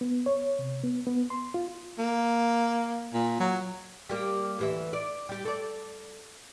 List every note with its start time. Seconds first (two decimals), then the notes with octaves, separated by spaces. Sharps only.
0.01 B3
0.26 C#5
0.59 C3
0.84 B3
1.07 B3
1.30 C6
1.54 F4
1.98 A#3
3.14 A#2
3.40 F#3
4.09 G3 A#3 G4
4.59 D2 E3 E5
4.93 D5
5.29 G3 G4
5.45 A4 D5